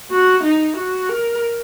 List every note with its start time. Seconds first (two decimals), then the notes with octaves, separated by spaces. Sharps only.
0.11 F#4
0.43 D#4
0.77 F#4
1.09 A#4